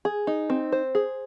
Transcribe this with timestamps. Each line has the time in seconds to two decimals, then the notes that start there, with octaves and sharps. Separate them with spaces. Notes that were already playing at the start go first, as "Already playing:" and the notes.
0.05 G#4
0.27 D#4
0.50 C4
0.72 C5
0.95 G#4